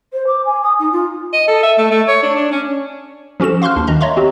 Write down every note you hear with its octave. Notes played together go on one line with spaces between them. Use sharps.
C5
D6
G#5
D#6
D#4
F4
D#5
A4
E5
A3
A3
C#5
D4
D4
C#4
F3 C#4 F#4 A4 E7
F5 C6 C#6 F6 F#6
D#2 D4
D#3 D#5 A#5
C#5 D#5 E5 A#5 C6 C#6
C4 F#4 G4